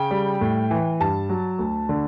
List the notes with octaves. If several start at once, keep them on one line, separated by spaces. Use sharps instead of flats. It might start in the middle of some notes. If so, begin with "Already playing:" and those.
Already playing: C#3 G5
G3
A2
E3
G2 A5
F#3
D2
D3